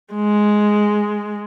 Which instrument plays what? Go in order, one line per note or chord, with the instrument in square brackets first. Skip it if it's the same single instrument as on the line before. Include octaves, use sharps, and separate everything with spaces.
[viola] G#3